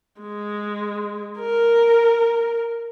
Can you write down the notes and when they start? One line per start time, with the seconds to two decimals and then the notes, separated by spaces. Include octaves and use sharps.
0.21 G#3
1.39 A#4